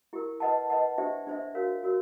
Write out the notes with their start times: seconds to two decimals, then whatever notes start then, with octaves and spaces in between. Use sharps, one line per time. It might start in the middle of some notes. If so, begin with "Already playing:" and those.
0.13 E4 G4 A#4
0.40 B4 D#5 F#5 A5
0.70 B4 D#5 F#5 A5
0.98 D4 G4 C5 E5
1.27 D4 G4 C5 E5
1.55 F#4 A#4 C#5 F5
1.83 F#4 A#4 C#5